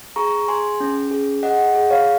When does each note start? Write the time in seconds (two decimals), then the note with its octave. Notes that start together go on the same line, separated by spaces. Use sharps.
0.16 G#4 A#5 C#6
0.48 G#4 G#5 C6
0.80 C#4
1.11 G#4
1.43 G#4 D#5 F#5
1.75 G#4
1.90 C#5 F5